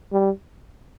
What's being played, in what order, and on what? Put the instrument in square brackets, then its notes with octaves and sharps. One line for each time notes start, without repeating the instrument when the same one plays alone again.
[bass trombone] G3